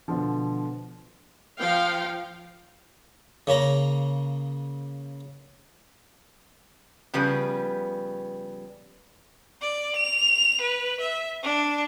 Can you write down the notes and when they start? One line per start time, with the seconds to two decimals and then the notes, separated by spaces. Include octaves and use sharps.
0.08 B2 D3 F3
1.58 F3 F5 G5
3.47 C#3 A#3 C#4 A#5
7.14 C#3 F3 G3 B3 B4
9.62 D5
9.96 F7
10.61 B4
11.01 E5
11.43 D4